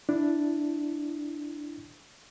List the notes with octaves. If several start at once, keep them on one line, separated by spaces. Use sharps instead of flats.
D4 E4